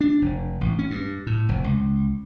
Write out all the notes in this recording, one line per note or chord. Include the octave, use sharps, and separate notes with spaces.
D4
F1
A1
C#4
G2
A2
F1
C#2